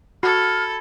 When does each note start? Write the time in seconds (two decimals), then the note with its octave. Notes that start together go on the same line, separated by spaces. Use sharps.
0.23 F#4 A4 B5 F6 G#6